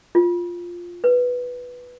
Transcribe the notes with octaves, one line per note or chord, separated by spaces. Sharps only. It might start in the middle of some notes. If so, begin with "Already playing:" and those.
F4
B4